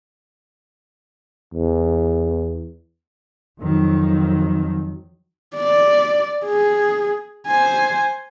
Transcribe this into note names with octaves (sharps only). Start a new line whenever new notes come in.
E2
F2 D#3 F#3
D5
G#4
C5 G#5